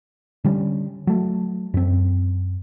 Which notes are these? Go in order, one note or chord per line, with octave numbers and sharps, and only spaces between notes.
D3 G3 G#3 C#4
F#3 A3
F#2 C4